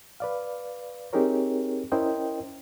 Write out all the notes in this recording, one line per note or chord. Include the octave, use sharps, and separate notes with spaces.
B4 D5 F5
C4 D#4 G4 G#4 A#4 C#5
C#4 E4 A#4 C5 D#5 G5